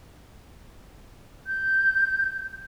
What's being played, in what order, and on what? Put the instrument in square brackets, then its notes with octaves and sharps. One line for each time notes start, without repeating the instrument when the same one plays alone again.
[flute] G6